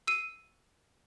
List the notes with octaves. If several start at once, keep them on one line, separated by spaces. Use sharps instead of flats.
E6 C7 D#7